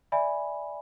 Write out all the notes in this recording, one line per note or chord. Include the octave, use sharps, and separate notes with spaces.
D5 E5 G#5 B5